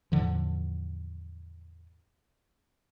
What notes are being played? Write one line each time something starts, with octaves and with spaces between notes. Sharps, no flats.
E2 A2 D3 F3